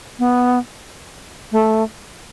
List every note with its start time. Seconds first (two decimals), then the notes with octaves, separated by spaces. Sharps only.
0.19 B3
1.52 A3